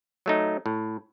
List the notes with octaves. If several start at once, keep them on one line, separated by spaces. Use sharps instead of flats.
F#3 A3 D#4
A2